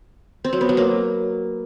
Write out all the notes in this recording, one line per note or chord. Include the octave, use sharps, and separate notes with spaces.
C4
F#3
B3
F#3
A#3